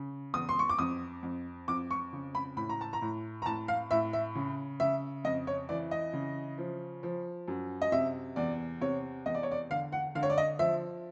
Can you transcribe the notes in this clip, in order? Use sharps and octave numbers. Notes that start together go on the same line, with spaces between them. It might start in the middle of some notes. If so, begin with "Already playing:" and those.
Already playing: C#3
E2 D#6
C6
C#6
D6
F2 D#6
F2
F2 D6
C#6
C#3
B5
A2 B5
A#5
A5
A#5
A2
A#5
A2 A5
F5
A2 E5
E5
C#3
C#3 E5
F2 D#5
C#5
E3 D5
D#5
C#3
F3
F3
F#2
D#5
C3 E5
E2 D5
C3 C#5
E2 D#5
D5
C#5
D5
D3 F5
F#5
D3 F5
C#5
D5
D#5
F3 E5